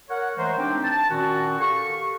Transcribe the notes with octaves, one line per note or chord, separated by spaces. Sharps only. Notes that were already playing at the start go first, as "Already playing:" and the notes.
A#4 C#5 F#5
E3 G#3 A3 A#4 C5
C4 D4 D#4 G4 G5
A5
A#2 D#3 C#4 F#4
G4 A4 F5 C#6